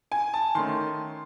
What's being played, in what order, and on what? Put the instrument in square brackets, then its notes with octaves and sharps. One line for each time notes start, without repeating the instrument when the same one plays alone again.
[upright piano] G#5
A5
D#3 A3 C#4 C6